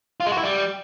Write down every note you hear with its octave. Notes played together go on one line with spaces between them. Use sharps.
F4
G#3
F#4
E4
G3